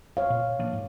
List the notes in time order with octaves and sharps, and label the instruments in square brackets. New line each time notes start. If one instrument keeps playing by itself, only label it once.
[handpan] C#5 F5
[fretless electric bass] A#2
F3 A#3 D4
G#2